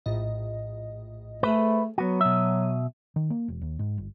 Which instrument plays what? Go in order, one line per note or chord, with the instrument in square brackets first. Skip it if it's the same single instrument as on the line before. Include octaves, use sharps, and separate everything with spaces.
[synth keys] A#1 A2 D#5
[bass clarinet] A3 [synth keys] G#4 A4 C5 [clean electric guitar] B4
[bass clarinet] F#3 [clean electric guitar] B3 F#4 [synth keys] D#7
[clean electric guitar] B2 E5
[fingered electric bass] D#3
A#3
E1
D#2
G#2
G1